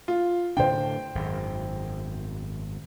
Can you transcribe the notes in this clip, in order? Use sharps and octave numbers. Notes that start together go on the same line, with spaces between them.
F4
A2 D3 D4 C5 G5
G#1 F#2